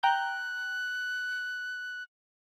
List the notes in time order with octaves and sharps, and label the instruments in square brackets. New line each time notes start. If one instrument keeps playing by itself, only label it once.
[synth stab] G5 A#5 G6 [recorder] F#6